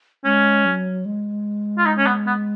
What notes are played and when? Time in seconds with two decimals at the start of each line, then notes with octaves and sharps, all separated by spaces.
0.25 G#3 C#4
0.65 F#3
1.05 G#3
1.78 F4
1.86 D#4
1.98 C#4
2.06 B3
2.27 B3